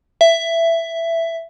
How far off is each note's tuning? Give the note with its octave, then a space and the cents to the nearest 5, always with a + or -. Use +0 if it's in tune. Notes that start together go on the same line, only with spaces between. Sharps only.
E5 +10